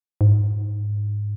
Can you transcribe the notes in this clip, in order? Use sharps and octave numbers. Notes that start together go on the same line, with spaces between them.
G#2